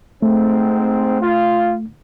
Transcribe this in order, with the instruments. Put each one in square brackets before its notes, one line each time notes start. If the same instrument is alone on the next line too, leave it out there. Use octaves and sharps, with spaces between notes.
[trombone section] G#2 C4 [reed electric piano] A3
[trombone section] F4